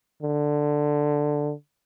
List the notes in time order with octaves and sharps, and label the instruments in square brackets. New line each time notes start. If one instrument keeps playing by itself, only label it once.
[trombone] D3